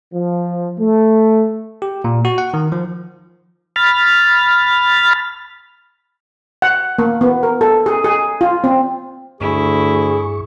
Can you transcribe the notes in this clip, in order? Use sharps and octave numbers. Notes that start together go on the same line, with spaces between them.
F3
A3
G4
A#2
F#4
F#5
D#3
F3
B5 F6 A6
F#5
A#3
B3
A#4
A4
G#4
G#4
F4
C4
D2 G2 E4 G#4 C#6